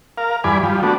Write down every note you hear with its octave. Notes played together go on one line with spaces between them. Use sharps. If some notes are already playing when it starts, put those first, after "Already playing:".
A#4 F5
E2 G2 D5 G#5 B5
F3 G3
A3 B3 D4 F#4